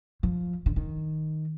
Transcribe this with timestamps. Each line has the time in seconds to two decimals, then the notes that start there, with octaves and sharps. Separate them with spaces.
0.23 F3
0.66 D3
0.76 D#3